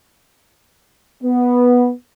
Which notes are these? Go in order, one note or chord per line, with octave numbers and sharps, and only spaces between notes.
B3